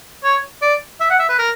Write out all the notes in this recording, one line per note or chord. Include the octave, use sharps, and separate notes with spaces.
C#5
D5
E5
F#5
E5
B4
A#4